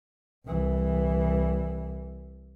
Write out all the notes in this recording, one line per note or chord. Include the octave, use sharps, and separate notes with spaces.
C2 E3